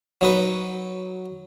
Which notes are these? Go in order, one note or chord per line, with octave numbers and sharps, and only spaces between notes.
F#3 D#4 B4